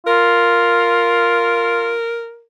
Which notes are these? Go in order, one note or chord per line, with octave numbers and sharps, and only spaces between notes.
F4 A#4